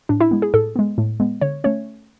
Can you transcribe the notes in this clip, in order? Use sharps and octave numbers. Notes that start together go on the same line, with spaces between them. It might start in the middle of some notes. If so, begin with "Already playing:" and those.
A2 D4
E4
G#3 B3
G#4
A2 A4
G#3 B3
A2
G#3 B3
D3 C#5
A3 C#4 C#5